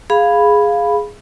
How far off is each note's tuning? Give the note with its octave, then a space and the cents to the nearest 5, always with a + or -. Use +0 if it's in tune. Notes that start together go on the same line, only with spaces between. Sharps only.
G#4 +0 F5 +0 B5 +0